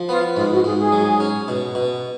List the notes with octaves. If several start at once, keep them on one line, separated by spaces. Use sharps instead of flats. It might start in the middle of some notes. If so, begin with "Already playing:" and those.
Already playing: F3
B3 F4
G#2 F4
F#4
G#2 G#4
G#4
F#3
C#4
B2
B2